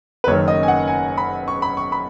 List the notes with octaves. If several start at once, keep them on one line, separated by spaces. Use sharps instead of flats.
B4
F#1 F#2 D#3 C#5
D#5
G#5
F#5
G#5
B5
C#6
B5
C#6
B5